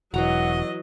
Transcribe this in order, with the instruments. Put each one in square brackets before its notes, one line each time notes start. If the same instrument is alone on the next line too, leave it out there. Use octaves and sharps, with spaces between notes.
[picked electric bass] E1 [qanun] E3 F#4 A#5 [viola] F#3 D#5 [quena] F#5